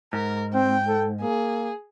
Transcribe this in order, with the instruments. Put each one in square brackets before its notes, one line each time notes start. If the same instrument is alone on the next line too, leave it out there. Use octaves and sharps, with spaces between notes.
[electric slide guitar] G#2 [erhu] A#4
[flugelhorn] C4 [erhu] G5
[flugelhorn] A4
[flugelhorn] A#3 [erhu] G#4